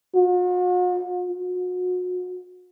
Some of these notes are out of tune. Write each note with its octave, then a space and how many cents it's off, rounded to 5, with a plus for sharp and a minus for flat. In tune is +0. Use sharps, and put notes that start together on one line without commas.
F#4 -45
F#4 -35